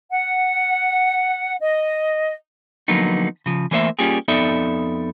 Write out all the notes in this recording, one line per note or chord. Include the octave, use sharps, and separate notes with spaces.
F#5
D#5
D3 F3 F#3 A#3 B3 D#4
C#3 F3
E3 A3 A#3 C5 D#5 E5
G3 A#3 C#4 F4 G4 G#4
F2 B3 D#4 A4 D5 E5